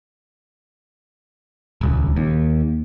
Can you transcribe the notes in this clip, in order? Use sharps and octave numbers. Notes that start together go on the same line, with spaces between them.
D#1 C#2
D#2